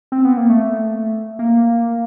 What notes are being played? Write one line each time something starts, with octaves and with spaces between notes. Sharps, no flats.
C4
B3
A#3
A3
A#3